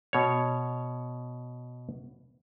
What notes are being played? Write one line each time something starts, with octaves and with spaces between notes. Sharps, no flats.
B2 C#5